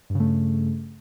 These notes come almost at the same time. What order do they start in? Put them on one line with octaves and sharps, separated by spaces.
G2 C#3 A3